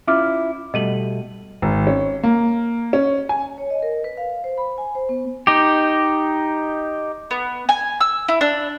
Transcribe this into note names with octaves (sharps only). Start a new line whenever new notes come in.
C#4 E4 F4 E5 D6 F6
B2 G3 A3 D#5 D#7 F#7
G#1
C#4
A#3
C#4
G#5
C#5
D#5
A#4
B4
F5
C5
B5
G#5
C5
B3
D#4 G4
B3
G#5
E6
E4
D4